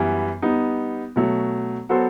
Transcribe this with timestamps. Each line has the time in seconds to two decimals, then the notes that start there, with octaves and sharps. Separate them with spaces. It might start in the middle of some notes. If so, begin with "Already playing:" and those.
Already playing: F#2 E3 G3 B3
0.42 G3 B3 D#4
1.16 B2 F#3 A3
1.89 F#3 B3 F#4 A4 C5